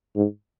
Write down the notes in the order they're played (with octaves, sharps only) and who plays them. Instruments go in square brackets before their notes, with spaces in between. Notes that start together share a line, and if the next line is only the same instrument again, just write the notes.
[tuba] G#2